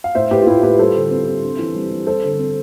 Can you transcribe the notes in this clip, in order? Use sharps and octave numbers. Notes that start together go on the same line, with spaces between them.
F5
A2 C5 E5
A2 G4 B4
F4
A2 E4 G4
A2 G4 B4
G3 A4 C5
D3
C4
C4
D4
E3
G3
G3
G3 A4 C5
D3
C4